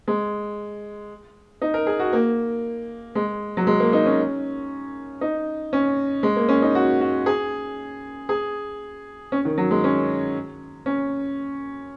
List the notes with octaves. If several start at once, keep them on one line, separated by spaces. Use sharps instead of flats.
G#3
D#4
A#4
G#4
F#4
A#3
G#3
F#3
G#3
A#3
D#4
C#4
D#4
C#4
G#3
A#3
C#4
D#4
F#4
F#4
G#4
G#4
C#4
D#3
F#3
G#3
C#4
C#4